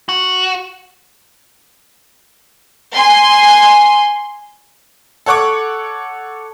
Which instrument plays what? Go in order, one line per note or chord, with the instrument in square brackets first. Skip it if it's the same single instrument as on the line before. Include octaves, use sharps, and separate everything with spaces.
[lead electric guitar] F#4
[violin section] G#5 C6
[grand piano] A4 C#5 F#5 C#6 D6